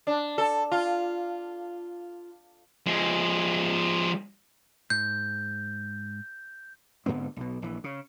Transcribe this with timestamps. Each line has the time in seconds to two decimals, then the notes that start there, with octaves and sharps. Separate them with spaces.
0.07 D4
0.38 A4
0.72 F4
2.87 F3 G#3
4.90 G#2 G6
7.06 G#2 D3 B3 C4
7.36 B1 B2
7.62 A#1 E3
7.84 C#3